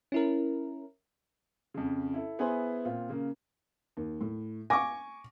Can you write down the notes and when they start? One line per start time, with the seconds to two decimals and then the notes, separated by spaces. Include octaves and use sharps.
0.12 C#4 E4 A#4
1.74 F2 C#3
2.14 E4 A4
2.39 B3 E4 G#4 B4 C5 G#5
2.85 A#2 C4 F4
3.09 C#3 A#3
3.97 D#2
4.21 A2
4.70 G#5 C#6 D6 A#6